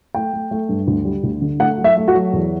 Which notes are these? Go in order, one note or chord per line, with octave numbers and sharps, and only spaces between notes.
A3 G5
A3
A3
G2
D2
G3
D2
D3
A3 F#5
F#3
E5
A3
F#4
F#3
E2